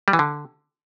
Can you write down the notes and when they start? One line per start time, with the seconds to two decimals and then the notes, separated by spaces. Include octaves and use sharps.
0.08 G3
0.13 E3
0.19 D3